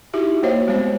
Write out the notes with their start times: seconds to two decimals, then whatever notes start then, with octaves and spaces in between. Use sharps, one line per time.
0.13 D#4 E4 F#4 G4 E5
0.43 A#3 F#4 C5 C#5 D#5 F5
0.67 G3 G#3 B3 C4 C5